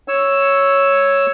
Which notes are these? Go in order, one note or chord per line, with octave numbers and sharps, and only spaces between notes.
C#5 E6